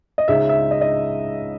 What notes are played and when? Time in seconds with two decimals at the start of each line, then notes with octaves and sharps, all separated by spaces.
0.18 D#5
0.28 C#2 C#3 G#3 D#4 E5
0.49 E5
0.71 D#5
0.81 D#5